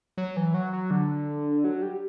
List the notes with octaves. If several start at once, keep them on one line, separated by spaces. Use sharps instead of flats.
F#3
E3
F#3
F#3
D3
F#3
G3